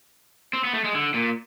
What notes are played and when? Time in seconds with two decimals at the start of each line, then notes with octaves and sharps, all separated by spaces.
0.53 C4
0.64 B3
0.73 A3
0.84 G#3
0.95 D3
1.14 A#2